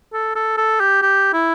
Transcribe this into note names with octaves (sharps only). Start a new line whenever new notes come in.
A4
A4
A4
G4
G4
E4